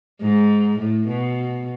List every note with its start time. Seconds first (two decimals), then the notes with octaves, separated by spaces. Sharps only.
0.22 G#2
0.80 A2
1.08 B2